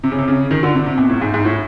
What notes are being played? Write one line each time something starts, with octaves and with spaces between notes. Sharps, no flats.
C3
C#3
C3
C#3
D#3
D3
C3
C3
B2
A2
G#2
G#2
A2